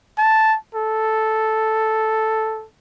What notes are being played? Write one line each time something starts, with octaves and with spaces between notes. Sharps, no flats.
A5
A4